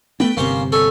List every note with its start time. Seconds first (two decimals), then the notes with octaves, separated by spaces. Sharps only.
0.20 A3 B3 D4 B4 G5
0.37 G1 C3 A#3 C#4 C5
0.72 A4 C#5 G#5